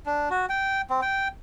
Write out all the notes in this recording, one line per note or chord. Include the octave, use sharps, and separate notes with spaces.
D4
F#4
G5
C4
G5